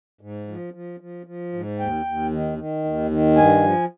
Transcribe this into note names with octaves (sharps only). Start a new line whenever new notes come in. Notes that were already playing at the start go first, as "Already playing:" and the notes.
G#2
F3
F3
F3
F3
G#2
D#2 G5
D#2
D#3
D#3
D#2
D#3
G2 G#5
F3